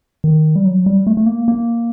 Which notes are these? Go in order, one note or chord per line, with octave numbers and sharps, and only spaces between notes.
D#3
G3
F#3
G3
A3
A3
A#3
A#3